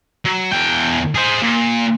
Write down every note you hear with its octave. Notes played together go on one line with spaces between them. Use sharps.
F#3
E2 G5
G#4 C5
A#2